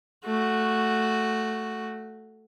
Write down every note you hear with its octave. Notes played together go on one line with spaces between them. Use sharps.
A3 F#4